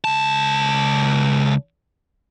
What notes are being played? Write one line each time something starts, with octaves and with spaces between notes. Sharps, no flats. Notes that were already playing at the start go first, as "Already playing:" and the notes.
C#2 A5